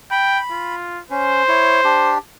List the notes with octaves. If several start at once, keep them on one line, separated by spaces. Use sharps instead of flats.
G5 B5
F4
C#4 C5
E4 C#5
D4 G4